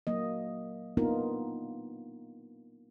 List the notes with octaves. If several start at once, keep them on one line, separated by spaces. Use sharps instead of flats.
F#3 A#3 D#5
A#3 B3 D4 D#4 F4 A#4